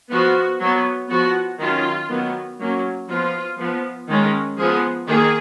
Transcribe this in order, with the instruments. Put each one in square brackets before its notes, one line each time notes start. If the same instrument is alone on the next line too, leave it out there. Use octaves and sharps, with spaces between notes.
[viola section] F3 B3 F#4
F#3 B3
F3 B3 F#4
D#3 F#3 C#4 F4
D#3 F#3 B3
F#3 A#3 C#4
F3 B3 F4
F3 B3
D#3 G#3 C#4
F3 B3 G#4
D#3 A#3 G#4